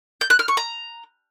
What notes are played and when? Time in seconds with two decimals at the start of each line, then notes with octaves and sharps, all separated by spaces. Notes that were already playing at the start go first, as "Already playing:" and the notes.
0.21 G6
0.30 F#6
0.39 F6
0.48 C#6
0.57 A#5